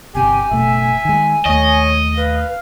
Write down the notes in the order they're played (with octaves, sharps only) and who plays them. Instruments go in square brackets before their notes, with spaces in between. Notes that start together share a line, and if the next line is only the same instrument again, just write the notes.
[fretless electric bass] G1 C3 [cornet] G4 [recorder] G#5
[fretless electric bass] F#1 B2 A3 [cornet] E5
[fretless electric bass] D#3 G#3
[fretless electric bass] D#2 A3 [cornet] C#5 [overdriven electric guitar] D#5
[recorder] B4 [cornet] F5